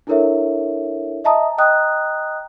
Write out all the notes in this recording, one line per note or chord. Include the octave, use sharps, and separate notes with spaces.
D4 E4 A4 A#4 C#5 E5
D#5 E5 A5 A#5 D#6
D#5 G5 A#5 D#6 F#6